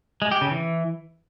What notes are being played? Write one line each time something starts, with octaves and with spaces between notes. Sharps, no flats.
G#3
G4
C#3
E3